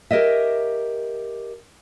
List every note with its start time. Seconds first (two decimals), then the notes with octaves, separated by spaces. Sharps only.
0.11 G4 A#4 C#5 D#5 E5